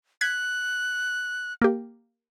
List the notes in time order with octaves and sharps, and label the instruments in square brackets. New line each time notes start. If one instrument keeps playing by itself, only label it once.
[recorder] F#6 [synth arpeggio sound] G#6 B6
[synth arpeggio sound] A#3 G4